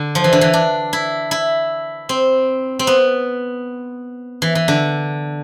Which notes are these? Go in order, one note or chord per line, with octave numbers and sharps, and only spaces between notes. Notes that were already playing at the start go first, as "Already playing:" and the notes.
Already playing: D3
F3
E3
D3
E3
D4
E4
E4
C4
C4
B3
E3
E3
D3